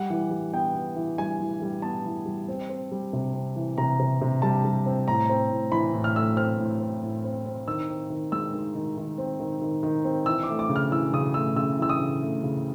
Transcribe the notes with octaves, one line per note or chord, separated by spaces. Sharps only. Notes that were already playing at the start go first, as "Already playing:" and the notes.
Already playing: G3 F#5
E3
G3
B3 G5
B3
E3
G3 G#5
E3
G3
B3 A5
E3
G3
C4
C4
G3
C3
C4
E3
C3 A#5
C3
C3
G3 A5
G3
C4
A2 A#5
C4
A2
E3 B5
A2
F6
A3 E6
C4 F6
A2
C4
A2
C4
C4
D#3 E6
C4
D#3
G#3 E6
D#3
D#3
D#3
C4
D#3
D#3
D#3
C4
E3 E6
D6
A3
D6
C#3
F6
E3 E6
C#3 D#6
A3 E6
C#3 E6
E3 E6
D#6
C#3
A3
C#3